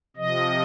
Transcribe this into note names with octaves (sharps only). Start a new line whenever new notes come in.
C3 F3 D#5